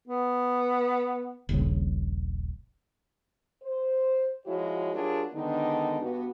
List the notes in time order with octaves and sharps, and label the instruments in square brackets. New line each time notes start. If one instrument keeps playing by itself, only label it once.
[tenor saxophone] B3
[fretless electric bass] D#1 A#1 C#3
[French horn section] C5
F3 G#3 E4 F#4 C#5
F#3 D4 F4 G4 G#4 A#4
D3 D#3 G#3 B3 D4 D#4
G2 B3 F#4